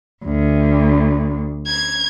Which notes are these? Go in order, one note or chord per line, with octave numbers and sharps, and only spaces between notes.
D2
G#6